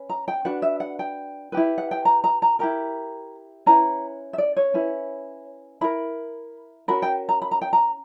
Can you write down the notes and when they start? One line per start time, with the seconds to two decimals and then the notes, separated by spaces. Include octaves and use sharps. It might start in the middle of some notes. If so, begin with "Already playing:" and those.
Already playing: C#4 B4
0.09 A#5
0.28 G5
0.45 D4 F#4 B4 F#5
0.62 E5
0.80 F#5
0.99 G5
1.52 E4 G4 B4
1.78 F#5
1.91 G5
2.05 A#5
2.24 A#5
2.42 A#5
2.59 E4 G4 A#4 A#5
3.66 C#4 E4 B4 A#5
4.33 E5
4.38 D5
4.56 C#5
4.74 C#4 E4 B4
5.81 E4 A#4 B5
6.88 C#4 F#4 A#4 B5
7.02 G5
7.29 A#5
7.42 B5
7.51 A#5
7.61 G5
7.73 A#5